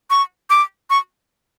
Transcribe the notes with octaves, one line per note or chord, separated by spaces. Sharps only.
C#6
D6
C#6